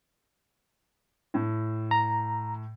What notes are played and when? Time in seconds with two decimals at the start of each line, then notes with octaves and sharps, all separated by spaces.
1.34 A2
1.91 A#5